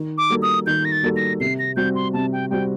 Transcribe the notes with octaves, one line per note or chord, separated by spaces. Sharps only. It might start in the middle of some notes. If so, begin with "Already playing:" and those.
Already playing: D#3
D6
G3 A#3 F#4 A4
D#6
D#3 G6
A#6
A6
G3 A#3 F#4 A4
A#6
C3 C7
A#6
G3 C4 F#4 G6
C6
C3 A5
G5
G3 C4 F#4 G5